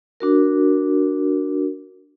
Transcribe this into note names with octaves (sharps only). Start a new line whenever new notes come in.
D4 F#4 A#4